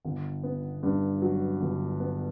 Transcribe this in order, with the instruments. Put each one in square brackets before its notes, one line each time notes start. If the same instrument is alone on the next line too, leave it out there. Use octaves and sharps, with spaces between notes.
[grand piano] G1
B3
G2
F#3
G1
B3